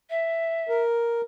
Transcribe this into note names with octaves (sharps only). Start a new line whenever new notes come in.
E5
A#4